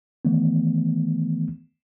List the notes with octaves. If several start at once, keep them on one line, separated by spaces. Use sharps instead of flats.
D#3 E3 A3 B3